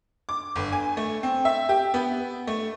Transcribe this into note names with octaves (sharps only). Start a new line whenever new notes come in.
D6
G1
G#5
A3
C4
E5
G4
B3
A3